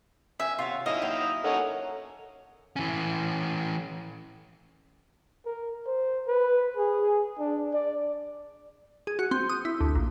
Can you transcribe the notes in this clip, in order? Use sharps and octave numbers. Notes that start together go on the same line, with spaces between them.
D#3 E5 G#5
C3 F4 C#5 F#5
D3 F3 C#4 D#4 E4 D#5 F5
D#2 F#3 G5
A#6
A#3 C#4 D#4 A4 C#5 F#5
E3 C#4
A#4
C5
B4
G#4
D4
D5
G#4
F#4
C4
D#6
E4
D2
A#1